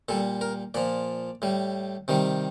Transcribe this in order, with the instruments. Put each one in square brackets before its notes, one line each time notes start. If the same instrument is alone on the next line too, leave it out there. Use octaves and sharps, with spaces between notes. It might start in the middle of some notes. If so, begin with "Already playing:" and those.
[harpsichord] A#2 G3 A4
A#4
A#2 F3 D5
A2 G3
C3 D#3 G3